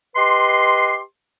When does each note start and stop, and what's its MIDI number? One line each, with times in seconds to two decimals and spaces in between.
0.16 1.00 67
0.16 1.00 71
0.16 1.00 75
0.16 1.00 84